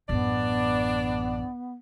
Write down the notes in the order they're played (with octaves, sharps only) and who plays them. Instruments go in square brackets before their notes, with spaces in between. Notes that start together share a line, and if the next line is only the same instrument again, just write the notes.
[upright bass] A1 F#2 [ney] B3 [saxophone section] D4 D5